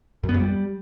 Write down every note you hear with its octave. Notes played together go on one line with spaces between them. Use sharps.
F#2
B3
F2
G3